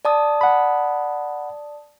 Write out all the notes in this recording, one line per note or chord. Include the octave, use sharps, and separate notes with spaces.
D5 A5 D#6
F#5 B5